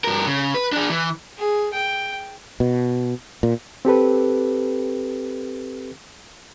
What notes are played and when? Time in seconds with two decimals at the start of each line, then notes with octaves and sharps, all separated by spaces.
0.04 G2 A#4
0.27 C#3
0.54 B4
0.72 D4 G#4
0.90 E3
1.38 G#4
1.73 G5
2.60 B2
3.43 A#2
3.85 C4 G4 A4 B4